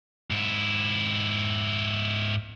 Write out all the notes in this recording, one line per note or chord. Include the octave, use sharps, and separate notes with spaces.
G#2 E4